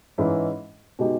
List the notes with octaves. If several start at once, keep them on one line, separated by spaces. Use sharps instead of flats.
G#2 E3 G#3 C#4 E4
B2 G#3 D#4 G4